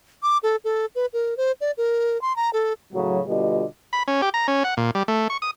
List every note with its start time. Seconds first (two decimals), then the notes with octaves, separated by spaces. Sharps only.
0.23 D6
0.43 A4
0.64 A4
0.95 B4
1.13 A#4
1.37 C5
1.61 D5
1.77 A#4
2.21 C6
2.36 A#5
2.53 A4
2.93 A2 C#3 F#3
3.26 B2 D3 G3 F4 D#5
3.93 B5
4.08 C#4
4.22 G4
4.34 A#5
4.48 C#4
4.64 F#5
4.77 A#2
4.95 G3
5.08 A3
5.30 C#6
5.42 D#6